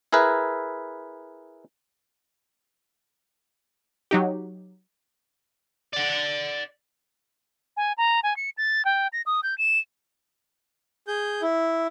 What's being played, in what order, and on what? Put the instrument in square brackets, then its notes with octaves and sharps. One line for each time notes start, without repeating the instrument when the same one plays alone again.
[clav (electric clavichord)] E4 G#4 A#4 B4 E5
[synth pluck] F#3 D#4 G4
[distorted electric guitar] D5 F#5
[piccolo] G#5
A#5
G#5
C#7
A6
G5
A#6
D#6
G6
E7
[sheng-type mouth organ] G#4 G6
E4